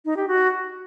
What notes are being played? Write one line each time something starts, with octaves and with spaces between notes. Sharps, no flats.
D#4
G4
F#4